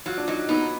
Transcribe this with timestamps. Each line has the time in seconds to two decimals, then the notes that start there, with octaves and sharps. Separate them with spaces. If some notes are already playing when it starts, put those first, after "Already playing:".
0.06 F#3 F4
0.18 D4
0.28 F#3 D#4
0.49 B3 D#4